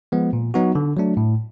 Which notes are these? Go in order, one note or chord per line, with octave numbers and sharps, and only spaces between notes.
F3 G#3 B3
A#2
F#3 B3 D#4 F#4
D3
F#3 A3 D4
A2